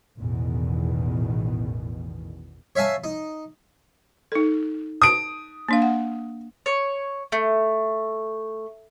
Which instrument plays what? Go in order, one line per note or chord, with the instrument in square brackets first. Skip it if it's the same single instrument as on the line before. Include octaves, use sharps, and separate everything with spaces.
[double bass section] A1 E2 B2 D#3
[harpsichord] C#5 E5 F5 G#5 A5
D#4
[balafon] D#4 A4
[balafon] A5 [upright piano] D#6 D7
[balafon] A#3 D4 F5
F#5
[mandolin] C#5
A3